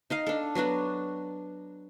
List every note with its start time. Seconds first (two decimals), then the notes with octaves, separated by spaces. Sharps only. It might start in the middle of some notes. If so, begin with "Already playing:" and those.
0.10 D#4 D#5 F5
0.27 D4 A4
0.55 F#3 B3 D4 F#4